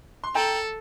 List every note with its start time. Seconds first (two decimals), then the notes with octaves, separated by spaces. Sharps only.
0.24 C6
0.35 A4 G5 A#5